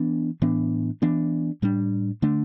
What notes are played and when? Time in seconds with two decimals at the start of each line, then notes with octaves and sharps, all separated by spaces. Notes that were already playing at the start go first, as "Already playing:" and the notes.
Already playing: E3 B3 D4
0.42 A2 E3 B3 D4
1.02 E3 B3 D4
1.62 A2 G3 D4
2.22 D3 A3 D4